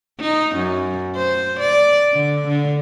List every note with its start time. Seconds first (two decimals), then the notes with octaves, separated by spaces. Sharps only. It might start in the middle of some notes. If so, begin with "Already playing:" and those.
0.20 D#4
0.56 F#2
1.16 C5
1.60 D5
2.13 D3
2.48 D3